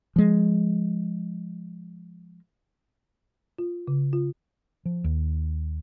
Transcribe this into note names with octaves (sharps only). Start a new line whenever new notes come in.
F3 G#3
F4
C#3
F4
F3
D#2